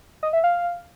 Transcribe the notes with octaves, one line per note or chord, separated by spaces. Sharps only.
D#5
E5
F5